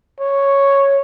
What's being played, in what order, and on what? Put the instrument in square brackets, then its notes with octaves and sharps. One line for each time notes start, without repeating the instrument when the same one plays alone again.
[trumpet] C#5